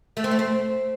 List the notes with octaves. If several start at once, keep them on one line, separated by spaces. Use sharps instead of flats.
A3
C4
A3
C4